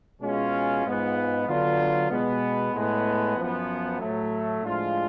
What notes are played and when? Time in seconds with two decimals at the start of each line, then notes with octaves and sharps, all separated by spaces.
0.21 B2 G#3 C#4 F4
0.84 G#2 G#3 B3 F4
1.47 D3 F#3 B3 D4 F4
2.10 B2 G#3 B3
2.73 A2 G#3 B3
3.36 F#2 F3 B3
3.99 A2 F#3 A3
4.62 A2 F3 G#3 D4 F4